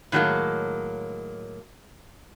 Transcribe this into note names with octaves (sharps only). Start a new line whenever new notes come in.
A2 D#3 F#3 G#3 A#3